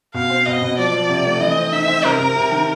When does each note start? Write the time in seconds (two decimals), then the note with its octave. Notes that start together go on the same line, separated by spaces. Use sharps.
0.14 B2 F5
0.30 C4
0.46 B2 D#5
0.62 B2
0.78 F3 D5
0.94 F3
1.10 C3
1.26 A3
1.41 E3 D#5
1.56 C4
1.72 D#4 E5
1.88 C4
2.04 C3 A#4
2.20 C3
2.36 C3
2.52 D#3